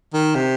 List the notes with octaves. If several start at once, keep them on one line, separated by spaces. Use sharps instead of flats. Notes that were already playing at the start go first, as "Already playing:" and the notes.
D#3
C3